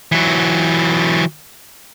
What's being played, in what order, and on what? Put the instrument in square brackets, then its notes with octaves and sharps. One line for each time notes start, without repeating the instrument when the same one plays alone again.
[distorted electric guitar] E3 F#3